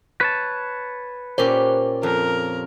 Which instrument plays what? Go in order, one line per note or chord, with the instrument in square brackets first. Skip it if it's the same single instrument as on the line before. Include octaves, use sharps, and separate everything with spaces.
[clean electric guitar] B4 C#5 A5
[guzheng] A#2 C#4 G4 [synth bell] C5
[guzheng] F2 [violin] A#4